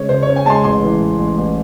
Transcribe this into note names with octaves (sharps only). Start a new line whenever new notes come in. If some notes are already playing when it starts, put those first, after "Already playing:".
Already playing: C#3 G#3 C#4 C#5
C#2 C5
C#5
C#4
G#5
G#3 A5 C6
A1 C6
E3
A2
A1
A1